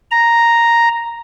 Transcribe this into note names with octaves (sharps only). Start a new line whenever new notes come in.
A#5